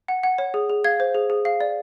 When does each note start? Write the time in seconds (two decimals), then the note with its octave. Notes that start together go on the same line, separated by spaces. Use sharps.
0.08 F#5
0.23 F#5
0.38 C#5
0.54 G#4
0.69 G#4
0.84 F5 G#6
1.00 C5
1.15 G#4
1.30 G#4
1.45 F5
1.61 D5